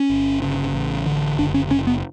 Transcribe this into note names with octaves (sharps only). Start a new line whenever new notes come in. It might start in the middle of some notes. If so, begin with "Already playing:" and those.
Already playing: C#4
G1
C#3
A1
D3
F#1 D4
C#4
F#1 C#4
B3